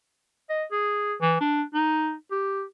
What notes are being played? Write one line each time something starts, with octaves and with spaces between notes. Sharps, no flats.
D#5
G#4
E3
D4
D#4
G4